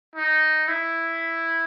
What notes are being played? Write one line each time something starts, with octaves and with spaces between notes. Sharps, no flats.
D#4
E4